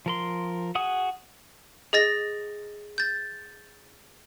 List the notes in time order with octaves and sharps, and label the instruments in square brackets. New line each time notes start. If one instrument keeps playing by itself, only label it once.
[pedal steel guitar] F3 A#4 C6
F#4 G#4 F#5 D#6
[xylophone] G#4 D#5 A6 A#6
G6 A6